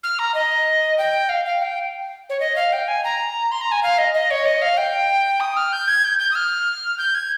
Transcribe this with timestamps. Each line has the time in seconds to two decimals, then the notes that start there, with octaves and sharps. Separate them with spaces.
0.03 F6
0.19 A#5
0.34 D#5
0.98 G5
1.29 F5
1.45 F5
1.62 G5
2.30 C#5
2.40 D#5
2.56 F5
2.73 G5
2.88 G#5
3.04 A#5
3.52 C6
3.61 A#5
3.72 G#5
3.83 F5
3.98 D#5
4.14 D#5
4.31 C#5
4.46 D#5
4.62 F5
4.77 G5
5.40 D#6
5.57 F6
5.73 G6
5.88 G#6
6.04 G6
6.19 G6
6.31 D#6
6.35 F6
6.98 G6
7.15 G#6